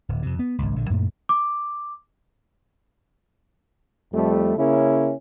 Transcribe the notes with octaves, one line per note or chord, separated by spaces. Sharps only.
D1
F2 C3
B3
G#1 C#2
A#1 D3
F#2 A#2 A3
D6
F2 G3 A3
C#3 A#3 C#4 E4